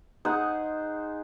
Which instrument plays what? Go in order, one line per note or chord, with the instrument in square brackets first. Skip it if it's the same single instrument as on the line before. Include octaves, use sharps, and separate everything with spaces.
[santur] D#4 G#4 C5 F#5